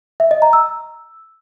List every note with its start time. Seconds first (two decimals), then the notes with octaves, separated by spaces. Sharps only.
0.20 E5
0.31 D#5
0.42 A#5
0.53 E6